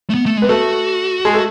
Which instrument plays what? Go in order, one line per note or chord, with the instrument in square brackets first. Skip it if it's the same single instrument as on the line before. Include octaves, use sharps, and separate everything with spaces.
[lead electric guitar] A3
B3
A3
[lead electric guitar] G#3 [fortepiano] B3
[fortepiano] A3 [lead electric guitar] F#4
[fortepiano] G#3
A3